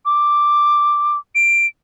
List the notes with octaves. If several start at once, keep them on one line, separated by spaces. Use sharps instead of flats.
D6
D7